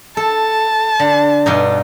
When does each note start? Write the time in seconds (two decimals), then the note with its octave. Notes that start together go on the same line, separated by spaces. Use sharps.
0.17 A4 A5
1.00 D3
1.46 G2 B2 D#4